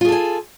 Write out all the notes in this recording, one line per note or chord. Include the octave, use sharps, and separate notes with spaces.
F4 G#4 A4 G#5